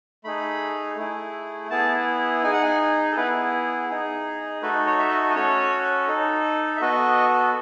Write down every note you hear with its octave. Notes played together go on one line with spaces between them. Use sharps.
A3 D#4 G#4 B5
A3 E4 G#4
B3 E4 G#4 A5
D#4 G#4 G#5
F#5
G#5
A4
B3 E4 G#4 B4
D#4 G#4
A3 D#4 F#4 A4 B4
C#5
E5
D#5
D#5
C#4 F#4 A4 C#5
D#4 A4
E5
B3 F#4 A4 D#5